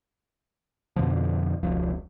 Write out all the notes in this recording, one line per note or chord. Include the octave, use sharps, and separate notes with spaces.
F2 B2 D3 F3
E1 C#2 F3